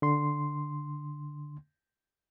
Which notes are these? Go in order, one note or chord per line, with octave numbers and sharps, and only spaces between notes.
D3 C6